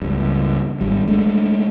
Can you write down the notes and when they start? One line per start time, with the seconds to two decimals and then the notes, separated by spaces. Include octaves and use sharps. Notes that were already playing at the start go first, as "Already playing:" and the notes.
0.02 C#2 G2
0.81 G#1 G3
1.08 G#3 A3 C#4 D4